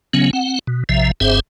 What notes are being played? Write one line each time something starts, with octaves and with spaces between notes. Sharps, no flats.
C#3 F#3 B3 C#4
C4 F#5
B2
A#1 C3 F3 E5
F#1 G2 C4 G#4 C5 E5